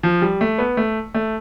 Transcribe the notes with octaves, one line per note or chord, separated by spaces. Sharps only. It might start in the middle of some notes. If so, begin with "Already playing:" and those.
F3
G3
A3
B3
A3
A3